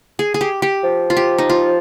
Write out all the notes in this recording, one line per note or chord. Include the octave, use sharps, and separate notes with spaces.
G#4
G#4
G4
G4
F3
F4
G4
D#4
F4